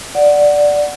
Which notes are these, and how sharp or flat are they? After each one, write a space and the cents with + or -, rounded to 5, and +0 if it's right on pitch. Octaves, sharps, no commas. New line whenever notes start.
D5 +0 F#5 +0